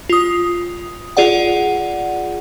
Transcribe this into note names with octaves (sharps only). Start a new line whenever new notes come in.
F4 D#6
F4 G#4 D5 F#5